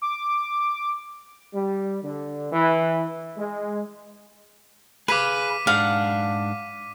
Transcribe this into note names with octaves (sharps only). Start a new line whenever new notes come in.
D6
G3
D3
E3
G#3
G#4 B4 F5 D6 B6 D#7
G#2 D4 F5 F#5